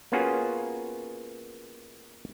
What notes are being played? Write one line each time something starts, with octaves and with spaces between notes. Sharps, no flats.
A#3 B3 C#4 F4 F#4 G#4